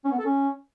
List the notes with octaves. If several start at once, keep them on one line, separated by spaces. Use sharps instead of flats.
C#4
B3
A4
C#4